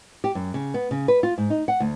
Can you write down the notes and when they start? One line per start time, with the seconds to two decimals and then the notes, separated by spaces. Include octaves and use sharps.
0.24 G4
0.35 F#2
0.54 C#3
0.74 B3
0.91 C#3
1.08 B4
1.23 F4
1.38 G#2
1.50 D#4
1.68 F#5
1.80 D2